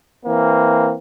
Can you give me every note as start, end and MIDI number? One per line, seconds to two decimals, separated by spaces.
0.25 0.94 52
0.25 0.94 58
0.25 0.94 60